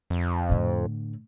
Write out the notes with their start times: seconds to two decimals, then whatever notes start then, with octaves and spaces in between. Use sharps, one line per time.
0.10 F2
0.49 A2 D3